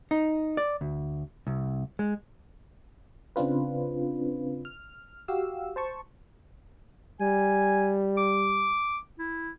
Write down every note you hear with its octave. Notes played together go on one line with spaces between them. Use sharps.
D#4
D5
D2
C2
G#3
C#3 C4 D4 F4 B4
F6
F#4 G4 F5 E6
C5 A5 C#6
G3 G#5
D6
E4